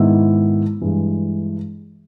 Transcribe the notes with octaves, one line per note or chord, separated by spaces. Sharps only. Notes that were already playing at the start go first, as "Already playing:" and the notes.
Already playing: G#2 D#3 G#3 B3 E4
G2 E3 G#3